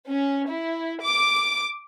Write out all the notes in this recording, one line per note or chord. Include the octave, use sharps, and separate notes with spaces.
C#4
E4
D6